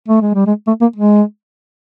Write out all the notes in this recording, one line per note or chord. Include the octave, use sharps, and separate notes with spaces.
A3
G#3
G3
G#3
A3
A#3
G#3